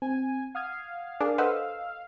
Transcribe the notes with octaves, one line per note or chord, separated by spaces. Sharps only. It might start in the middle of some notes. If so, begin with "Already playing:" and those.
C4 G#5
F5 F#5 D#6 G#6
D4 G#4 A#4 D5
A4 B4 C5 D#5 F#5 E6